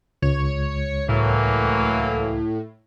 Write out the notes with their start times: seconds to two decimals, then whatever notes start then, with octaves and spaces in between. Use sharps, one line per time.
0.22 C#2 C#5
1.08 A2 E3 F#3 A#3